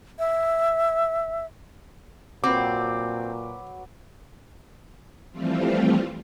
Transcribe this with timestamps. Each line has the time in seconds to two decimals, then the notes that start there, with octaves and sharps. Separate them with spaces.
0.19 E5
2.44 A#2 F#3 C4 B4 D6
5.31 E3 F3 G3 A3 C4 F4